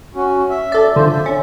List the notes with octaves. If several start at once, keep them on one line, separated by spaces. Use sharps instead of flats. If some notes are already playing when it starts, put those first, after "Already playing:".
C#4 F#4
E5
A4 D5
D3 F4 C5
E5
C#4